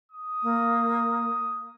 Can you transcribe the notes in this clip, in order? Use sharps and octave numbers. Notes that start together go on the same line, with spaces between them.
D#6
A#3